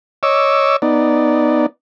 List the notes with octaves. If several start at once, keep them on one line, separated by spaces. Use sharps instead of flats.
C#5 D#5 C#6 D6 E6
B3 D#4 D5